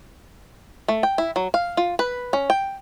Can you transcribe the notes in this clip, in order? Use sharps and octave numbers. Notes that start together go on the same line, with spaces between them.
A3
G5
E4
F#3
F5
F4
B4
C#4
G5